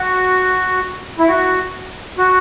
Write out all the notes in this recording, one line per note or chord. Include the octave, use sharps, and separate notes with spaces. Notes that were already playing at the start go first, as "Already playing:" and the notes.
Already playing: F#4
E4
F#4
F#4